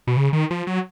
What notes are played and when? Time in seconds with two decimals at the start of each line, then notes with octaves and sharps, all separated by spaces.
0.07 B2
0.17 C#3
0.33 D#3
0.51 F3
0.67 F#3